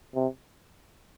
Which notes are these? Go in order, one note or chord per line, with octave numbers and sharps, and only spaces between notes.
C3